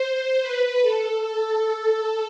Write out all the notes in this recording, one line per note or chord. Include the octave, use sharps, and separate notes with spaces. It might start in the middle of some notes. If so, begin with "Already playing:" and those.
Already playing: C5
B4
A4
A4